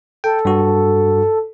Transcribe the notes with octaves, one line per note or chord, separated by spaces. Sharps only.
A4 G5
G2 F#4